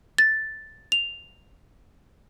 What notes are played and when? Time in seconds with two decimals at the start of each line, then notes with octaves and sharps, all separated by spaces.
0.18 A6
0.92 F7